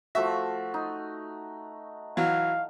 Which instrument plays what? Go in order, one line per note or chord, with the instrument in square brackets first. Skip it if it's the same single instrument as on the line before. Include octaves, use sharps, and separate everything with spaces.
[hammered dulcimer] F3 A3 F#4 [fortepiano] E5
[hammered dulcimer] D#4
[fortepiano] E3 F#3 [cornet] F5